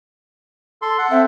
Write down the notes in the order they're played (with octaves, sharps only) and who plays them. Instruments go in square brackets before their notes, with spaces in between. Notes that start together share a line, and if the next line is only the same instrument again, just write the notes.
[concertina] A4 C6
A4 F#5
[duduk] C4 [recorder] E5